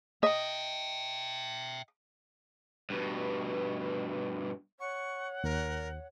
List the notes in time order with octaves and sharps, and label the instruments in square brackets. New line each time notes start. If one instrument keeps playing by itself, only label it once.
[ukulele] D#5 [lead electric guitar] E5 G5
[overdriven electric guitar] G2 B2
[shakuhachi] C#5 [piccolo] F#5 [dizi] C#6
[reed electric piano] D#2 [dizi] A#4